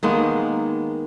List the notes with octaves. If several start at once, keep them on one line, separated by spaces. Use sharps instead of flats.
D#3 G#3 A#3 B3